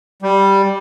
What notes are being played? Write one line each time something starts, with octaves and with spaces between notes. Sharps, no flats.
G3